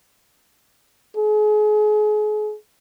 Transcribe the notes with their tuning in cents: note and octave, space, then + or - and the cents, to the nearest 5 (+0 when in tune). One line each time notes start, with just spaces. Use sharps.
G#4 +35